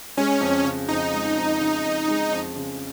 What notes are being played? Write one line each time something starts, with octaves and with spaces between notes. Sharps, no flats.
G#3 C#4
F2
C#3
F2 D#4
G#3
F2
C#3
F2
G#3
F2
C#3